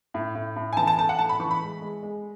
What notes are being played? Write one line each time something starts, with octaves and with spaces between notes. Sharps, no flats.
A2
A2
A2
G#5
E3 A5
A5
A3 A5
F#5
A2 A5
B5
E3 C#6
B5
G#3
G#3
G#3